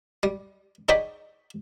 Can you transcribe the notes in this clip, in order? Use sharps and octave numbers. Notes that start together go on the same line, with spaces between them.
G3
D#4 G#4 C#5 D5 G5 B5